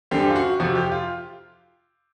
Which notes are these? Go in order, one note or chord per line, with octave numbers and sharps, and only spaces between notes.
F#2 D3 G3 C4 G4
F4
F#4
F2 C3 F3 F#4
G4
F4